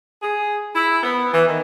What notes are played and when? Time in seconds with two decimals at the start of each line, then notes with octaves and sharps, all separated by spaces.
0.23 G#4
0.74 E4
1.03 B3
1.33 E3
1.48 D#3